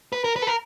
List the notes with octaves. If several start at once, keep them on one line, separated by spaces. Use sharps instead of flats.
B4
A#4
B4
A4
A#4